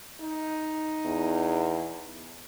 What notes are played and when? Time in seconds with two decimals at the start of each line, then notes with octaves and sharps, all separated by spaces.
0.21 D#4
1.05 E2